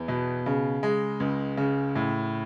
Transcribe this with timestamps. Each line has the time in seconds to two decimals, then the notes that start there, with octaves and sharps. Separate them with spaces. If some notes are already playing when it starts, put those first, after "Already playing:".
Already playing: E2
0.08 B2
0.46 C#3
0.83 G#3
1.20 C#2
1.57 C#3
1.95 A2